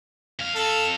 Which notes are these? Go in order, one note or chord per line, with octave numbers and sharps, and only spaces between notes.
F2 F5
A4